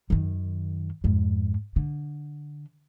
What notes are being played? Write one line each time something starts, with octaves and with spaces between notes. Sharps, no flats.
F#2 D#3
F2 G#2
D3